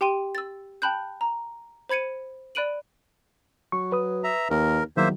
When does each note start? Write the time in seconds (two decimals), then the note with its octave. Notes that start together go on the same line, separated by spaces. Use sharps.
0.01 G4 G5 C6 D#7
0.35 E6 A6
0.82 G5 A5 B5 F#6 G6
1.21 A#5
1.89 C5 B5 G#6 C#7 D#7
2.55 D5 B5 F#6 D7 D#7 F#7
3.72 F#3 C#6
3.92 B4 D#6
4.24 E5 A#5
4.50 D#2 A#4
4.97 E2 D#3 F#3 A#3 C5 E5